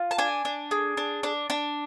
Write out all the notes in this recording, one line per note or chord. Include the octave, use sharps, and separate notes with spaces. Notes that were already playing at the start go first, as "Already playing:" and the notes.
Already playing: F4
A5
D4 G#5
D4
G#4
D4
D4
D4